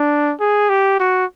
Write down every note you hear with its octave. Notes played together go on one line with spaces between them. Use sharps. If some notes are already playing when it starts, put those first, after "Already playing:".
Already playing: D4
G#4
G4
F#4